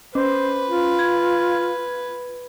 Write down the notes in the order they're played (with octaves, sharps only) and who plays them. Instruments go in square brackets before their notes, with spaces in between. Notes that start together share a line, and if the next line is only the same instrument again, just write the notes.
[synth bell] C#4 [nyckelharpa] B4 [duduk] C5
[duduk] F4
[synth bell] G#6